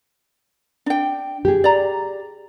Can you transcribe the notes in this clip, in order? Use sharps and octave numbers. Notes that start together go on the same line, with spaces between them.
D4 G5
G4 G#4
D5 A#5